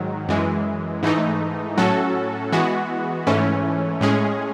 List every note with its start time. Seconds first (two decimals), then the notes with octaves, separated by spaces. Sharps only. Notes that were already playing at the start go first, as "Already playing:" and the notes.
Already playing: G#2 D#3 F#3
0.28 F#2 E3 G#3
1.03 G#2 E3 A3 D#4
1.77 A2 F#3 C#4 F#4 A4
2.52 E3 G#3 B3 F#4
3.27 G#2 E3 A3 C#4
4.01 A2 G#3 C#4 G#4